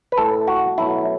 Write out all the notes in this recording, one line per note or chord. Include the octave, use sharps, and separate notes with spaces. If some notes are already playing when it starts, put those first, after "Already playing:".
B4
A2 E3 A3 A4
F#4
B2 F#3 A3 E4